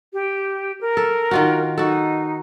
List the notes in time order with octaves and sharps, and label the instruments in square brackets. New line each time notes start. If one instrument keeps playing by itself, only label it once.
[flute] G4
A#4
[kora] A4
D#3 F4 F#4
[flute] D#4 [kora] F#4 A4